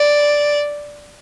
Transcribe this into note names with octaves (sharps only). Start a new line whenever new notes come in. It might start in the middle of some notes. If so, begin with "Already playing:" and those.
Already playing: D5